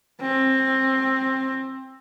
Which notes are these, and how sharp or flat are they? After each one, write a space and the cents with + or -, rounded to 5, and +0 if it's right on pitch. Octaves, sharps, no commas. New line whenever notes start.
C4 +20